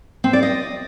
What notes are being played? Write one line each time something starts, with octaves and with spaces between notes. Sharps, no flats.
C4
D5
D#5